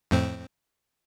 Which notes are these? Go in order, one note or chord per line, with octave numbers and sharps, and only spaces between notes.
F2 A2 C4